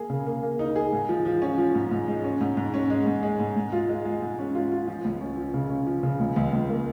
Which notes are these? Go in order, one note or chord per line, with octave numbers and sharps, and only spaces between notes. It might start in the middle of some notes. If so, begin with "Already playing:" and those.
Already playing: A#3 G#4
C#3
A#3
A#3
D#4
G#4
G#2
F3
F3
C#4
F3
G#2
G#2
G#3
C#4
G#2
G#2
C#4
G#3
G#2
G#3
G#2
G#2
F4
G#3
G#3
G#2
C#4
F4
F4
F3
C#2
C#4
F3
C#3
C#4
F3
C#3
C#2
C#2
C#2
A#3